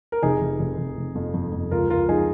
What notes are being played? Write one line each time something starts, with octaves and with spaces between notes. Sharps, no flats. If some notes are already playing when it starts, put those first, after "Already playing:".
A#4
F1 D#4 G#4
F1
F1
F1
F1
F2
F2
F2
C#2 F4 A#4
C#2 F4 A#4
F3 D#4 G#4